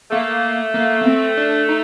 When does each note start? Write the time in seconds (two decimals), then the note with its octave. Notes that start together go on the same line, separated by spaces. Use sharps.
0.11 A3 A#3
0.74 A#3
1.01 A#3
1.05 C4
1.37 D4
1.69 D#4